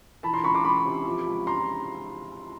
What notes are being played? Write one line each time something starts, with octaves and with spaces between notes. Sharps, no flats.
E3 A5 B5
A#5 C6
C#2 B5 C#6
C6 D6
C#2 B5 C#6
C3
F3
C#2
A#5 C6